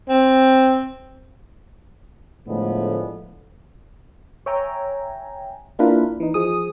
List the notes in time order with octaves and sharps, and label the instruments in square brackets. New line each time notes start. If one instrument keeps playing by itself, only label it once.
[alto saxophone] C4
[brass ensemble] A2 D3 F3 G#3 A3 B3
[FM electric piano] C#5 E5 G5 G#5 A#5
A#3 D4 E4 F4 A#4 B4
E3 D#4
F3 G#4 D#6